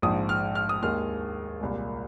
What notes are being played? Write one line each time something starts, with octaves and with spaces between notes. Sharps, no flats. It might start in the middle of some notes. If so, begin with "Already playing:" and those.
A#1 G#2 F3 D#6
F6
F6
D#6
D#2 D#3 G#3 F6
C2 A#2 G#3